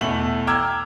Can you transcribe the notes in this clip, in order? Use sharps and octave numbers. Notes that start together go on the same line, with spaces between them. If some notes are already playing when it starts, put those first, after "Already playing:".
E2 B2 A3 E4 F#7
G5 A#5 D6 E6 F6 G#6